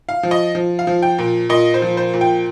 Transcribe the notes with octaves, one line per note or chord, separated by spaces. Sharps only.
F5
F3
D#5
F3
F5
F3
G5
A#2
A#2 D#5
C5
F3
C5
A#2
G5